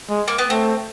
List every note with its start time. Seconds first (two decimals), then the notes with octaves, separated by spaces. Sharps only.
0.10 G#3
0.28 A#3
0.38 B3
0.49 A3 C4